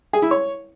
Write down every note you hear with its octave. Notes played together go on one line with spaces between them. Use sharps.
G#4
E4
C#5